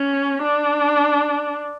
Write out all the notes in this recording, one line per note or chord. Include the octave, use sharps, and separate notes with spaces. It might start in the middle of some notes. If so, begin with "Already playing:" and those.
Already playing: C#4
D4